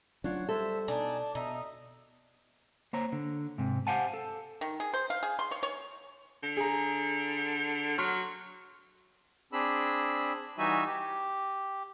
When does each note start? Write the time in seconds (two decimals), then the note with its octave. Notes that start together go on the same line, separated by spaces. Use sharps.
0.24 D2 F#3 C#4 D4 F4 C#5 F#5
0.49 G3 A4 C5 E5
0.88 B2 D4 D#4 G#5 A5
1.35 B2 D#4 E5
2.93 A#3 C5 C#5 A#5
3.12 D3
3.58 G#2 C3
3.87 G4 C5 F5 F#5 G#5 A5
4.14 A4
4.61 D#3
4.80 G#4
4.94 C5
5.10 F5
5.23 G#4
5.39 C6
5.51 C#5
5.63 C#5
6.43 D3
6.57 G#4 A#5
7.98 F#3 C6 F6
9.53 C4 D4 G#4 B5 E6
10.58 E3 G3 D#4 F#4 E5 G#5
10.86 G4